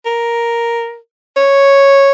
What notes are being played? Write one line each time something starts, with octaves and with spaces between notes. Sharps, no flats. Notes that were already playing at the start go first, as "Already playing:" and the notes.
A#4
C#5